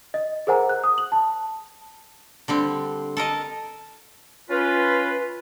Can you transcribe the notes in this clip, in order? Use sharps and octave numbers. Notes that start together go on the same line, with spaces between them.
D#5
G#4 A#4 C5 F#5 G#5 A#5
F#6
D#6
F#7
A5
D3 G3 C4
A4 A#4 D#5 A5
C#4 F4 B4